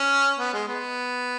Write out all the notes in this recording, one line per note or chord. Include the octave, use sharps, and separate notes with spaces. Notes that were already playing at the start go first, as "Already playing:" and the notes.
Already playing: C#4
B3
G#3
B3